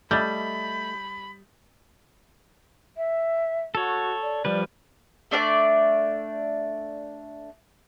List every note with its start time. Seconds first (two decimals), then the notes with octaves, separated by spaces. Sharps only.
0.11 G3 A3 D#5 E5 B5 G6 A6
2.97 E5
3.75 F#4 A4 C#5
4.22 D5
4.45 F3 G3 B4
5.31 A3 D4 A4 D5